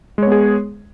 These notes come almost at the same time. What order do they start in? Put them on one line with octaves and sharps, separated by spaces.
G#3 C#5 B3 G#4